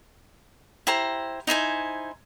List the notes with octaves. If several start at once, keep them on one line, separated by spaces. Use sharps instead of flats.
E4 G4 C5 A#5
D#4 E4 C5 G#5